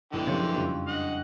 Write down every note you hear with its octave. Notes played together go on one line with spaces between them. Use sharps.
G1 D3 E3 G#3 D4 E4 G5
F#2 C#3 F3 F#3 G4 C5 C#5
G#4
F2 C#3 G3
D4 D#5 F#5